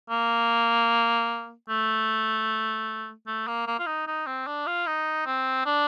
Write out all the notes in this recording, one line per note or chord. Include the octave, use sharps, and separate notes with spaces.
A#3
A3
A3
A#3
A#3
F4
D#4
D#4
C4
D4
F4
D#4
C4
D4